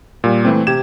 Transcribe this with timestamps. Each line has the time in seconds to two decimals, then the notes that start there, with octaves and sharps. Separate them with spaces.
0.24 A#2 G3
0.45 E3 A3 C4
0.67 C3 G4 G#6 E7